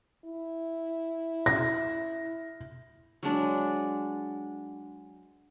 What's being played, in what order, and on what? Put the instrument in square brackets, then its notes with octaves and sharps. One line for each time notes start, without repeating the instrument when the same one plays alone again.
[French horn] E4
[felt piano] A#6
[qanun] F#3 G#3 D4